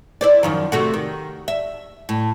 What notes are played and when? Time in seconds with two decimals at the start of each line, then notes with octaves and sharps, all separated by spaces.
0.21 E4 C5 D5
0.43 F#2 D#3 F3
0.72 C3 A3 F#4
0.94 D#3
1.48 E5
2.09 A2